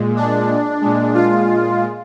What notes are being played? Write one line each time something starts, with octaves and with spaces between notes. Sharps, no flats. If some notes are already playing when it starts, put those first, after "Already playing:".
Already playing: A#2 G#3
D4
A#2 G#3
F4